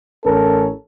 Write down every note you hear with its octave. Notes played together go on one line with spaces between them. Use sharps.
A1 C#4 A4 A#4